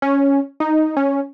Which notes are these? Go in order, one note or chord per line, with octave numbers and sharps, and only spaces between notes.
C#4
D#4
C#4